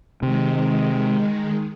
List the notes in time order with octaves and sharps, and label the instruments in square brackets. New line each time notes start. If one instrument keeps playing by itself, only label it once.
[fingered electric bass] C3 [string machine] D#3 G#3